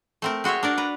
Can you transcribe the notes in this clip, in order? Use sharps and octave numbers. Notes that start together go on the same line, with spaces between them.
A3 C4 A#4
G#3 F#4 C5 C#5 E5
D4 A#4 D5
B4 A#5